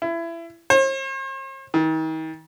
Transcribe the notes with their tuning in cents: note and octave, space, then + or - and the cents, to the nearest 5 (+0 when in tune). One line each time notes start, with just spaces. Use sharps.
E4 +25
C5 +45
D#3 +40